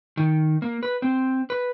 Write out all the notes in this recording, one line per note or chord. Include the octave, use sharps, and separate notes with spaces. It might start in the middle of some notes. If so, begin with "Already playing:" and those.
D#3
A#3
B4
C4
B4